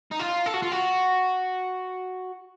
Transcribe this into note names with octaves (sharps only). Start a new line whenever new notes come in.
D#4
F4
A4
F#4
F4
F#4